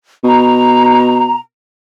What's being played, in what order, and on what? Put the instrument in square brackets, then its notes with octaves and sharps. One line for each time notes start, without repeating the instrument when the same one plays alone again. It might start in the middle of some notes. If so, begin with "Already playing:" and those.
[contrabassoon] B2 [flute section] A#5